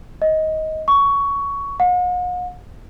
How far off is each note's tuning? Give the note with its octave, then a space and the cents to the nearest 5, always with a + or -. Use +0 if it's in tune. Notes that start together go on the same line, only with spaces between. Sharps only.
D#5 +15
C#6 +15
F#5 -45